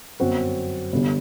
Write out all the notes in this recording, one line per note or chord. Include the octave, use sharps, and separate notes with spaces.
G1 F#2 F#3 C4 F#4
G1 G2 D3